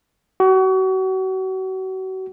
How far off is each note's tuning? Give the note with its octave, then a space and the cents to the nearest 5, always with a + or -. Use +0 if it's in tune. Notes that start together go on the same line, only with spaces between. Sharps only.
F#4 +35